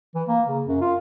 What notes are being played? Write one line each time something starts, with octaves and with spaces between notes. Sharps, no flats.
E3
A#3
C#3
F#2
F4